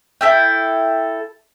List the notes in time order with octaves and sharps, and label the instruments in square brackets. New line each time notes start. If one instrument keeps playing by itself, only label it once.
[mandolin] E4 A4 G5